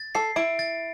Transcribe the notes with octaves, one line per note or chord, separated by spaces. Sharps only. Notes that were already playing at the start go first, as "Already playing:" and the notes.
Already playing: A6
A4 C7
E4 D7
A6